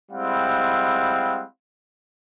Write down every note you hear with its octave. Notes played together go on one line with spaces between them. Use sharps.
G3 G#3 C4 E4 F5 F#5